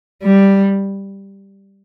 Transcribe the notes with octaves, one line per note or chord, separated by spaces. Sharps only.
G3